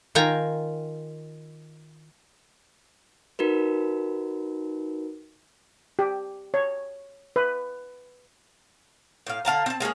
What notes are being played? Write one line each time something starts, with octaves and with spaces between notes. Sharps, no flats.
D#3 F4 G5 G#5 A#5
D#4 F#4 A#4 B4
G4
C#5
B4
A2 F5
D3 F5 A5 A#5
C4 A5
G#3 A#3 C#4 G#4